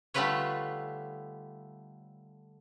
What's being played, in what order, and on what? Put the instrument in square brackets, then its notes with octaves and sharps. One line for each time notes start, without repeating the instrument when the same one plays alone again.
[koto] D3 G3 A3 F4 B4 C#5